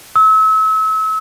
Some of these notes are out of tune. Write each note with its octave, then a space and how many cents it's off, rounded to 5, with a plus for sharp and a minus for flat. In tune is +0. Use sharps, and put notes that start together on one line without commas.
E6 -35